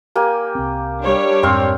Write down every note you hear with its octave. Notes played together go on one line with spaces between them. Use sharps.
A#3 G4 G#5
C2 C4
G3 D4 C#5
F2 G#2 C4 F5 C6